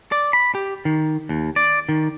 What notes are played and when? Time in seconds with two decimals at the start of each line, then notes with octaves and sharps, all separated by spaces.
0.12 D5
0.33 B5
0.55 G4
0.85 D#3
1.29 D#2
1.56 D5
1.89 D#3